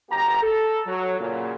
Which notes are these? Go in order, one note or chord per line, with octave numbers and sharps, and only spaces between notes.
G1 F#2 B3 G4 A#5
A4
F#3
A#2 C#3 F#3